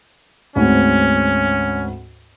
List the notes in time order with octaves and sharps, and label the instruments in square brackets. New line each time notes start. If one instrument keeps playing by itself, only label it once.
[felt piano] D2 G#2 C4 [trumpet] C#4